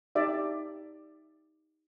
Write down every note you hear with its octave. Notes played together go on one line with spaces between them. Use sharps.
D#4 G4 D5 E5